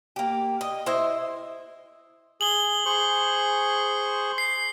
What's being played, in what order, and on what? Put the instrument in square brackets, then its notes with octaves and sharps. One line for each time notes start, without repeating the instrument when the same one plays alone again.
[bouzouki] A#3 G4
D#5
E4 C5 D#5 E5
[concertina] G#4 [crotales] F#7 G7
[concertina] G#4 C5 C#6
[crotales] C7